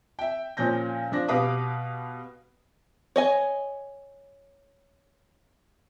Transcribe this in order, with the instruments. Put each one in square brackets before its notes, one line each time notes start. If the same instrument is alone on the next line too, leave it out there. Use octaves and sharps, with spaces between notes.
[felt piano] E5 G5
A#2 F3 C#4 G6 A#6
F3 D4 A#6
B2 G4 B4 F5 D6 D#6
[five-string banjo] C#5 D#5 G#5